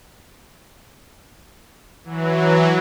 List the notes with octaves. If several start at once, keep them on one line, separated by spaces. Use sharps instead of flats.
E3 F#3